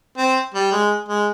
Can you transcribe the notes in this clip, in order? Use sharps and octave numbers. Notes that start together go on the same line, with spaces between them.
C4
G3
G#3
G#3